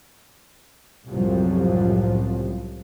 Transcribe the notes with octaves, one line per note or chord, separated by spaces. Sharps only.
C2 F#2 A2 C3 F3 F#3